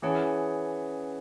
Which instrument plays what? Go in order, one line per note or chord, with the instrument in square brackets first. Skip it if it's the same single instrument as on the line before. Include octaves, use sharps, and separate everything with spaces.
[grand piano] E3 [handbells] C#4 G#4 C#5 F#5 A5